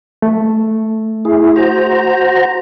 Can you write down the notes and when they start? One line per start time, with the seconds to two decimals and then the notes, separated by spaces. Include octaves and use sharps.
0.22 A3
1.25 E4 G#4
1.56 F#4 C5 A#5